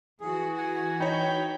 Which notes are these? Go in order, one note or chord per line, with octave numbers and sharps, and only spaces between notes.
E3 F#4 G#4
F#5 G#5
D#4 C#5 G5 B5